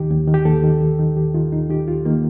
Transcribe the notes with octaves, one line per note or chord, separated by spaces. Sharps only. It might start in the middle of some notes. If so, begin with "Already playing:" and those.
Already playing: D#2 D#3 G4
D#2
D#3
G4
D#2 A4
D#3
D#2
D#3
D#2 G4
D#3 F4
D#2 D#4
D#3 G4
D#2 F4
D#3 A#3